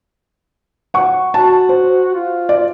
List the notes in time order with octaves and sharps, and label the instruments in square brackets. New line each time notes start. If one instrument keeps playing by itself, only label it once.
[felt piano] F#5 C#6
[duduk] F#4 [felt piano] A5
[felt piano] C5
[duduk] F4
[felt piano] D5